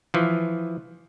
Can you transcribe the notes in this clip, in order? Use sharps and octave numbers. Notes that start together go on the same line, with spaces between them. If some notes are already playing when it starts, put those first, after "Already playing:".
E3 F3